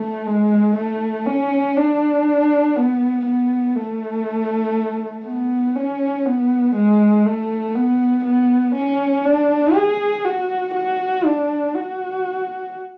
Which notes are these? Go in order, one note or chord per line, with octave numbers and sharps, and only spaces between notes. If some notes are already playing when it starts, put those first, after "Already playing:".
Already playing: A3
G#3
A3
C#4
D4
B3
B3
A3
B3
C#4
B3
G#3
A3
B3
B3
C#4
D4
G#4
F#4
F#4
D4
F#4